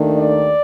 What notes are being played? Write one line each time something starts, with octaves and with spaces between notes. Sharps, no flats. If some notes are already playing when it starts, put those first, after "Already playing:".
Already playing: D#2 D#3 A3 D4
D5